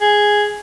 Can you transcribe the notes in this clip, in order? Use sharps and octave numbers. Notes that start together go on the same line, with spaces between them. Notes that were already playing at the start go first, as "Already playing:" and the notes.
G#4